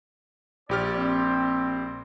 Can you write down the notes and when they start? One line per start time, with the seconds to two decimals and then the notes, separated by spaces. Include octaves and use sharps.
0.69 A#1 G4 D5 F6
0.96 C4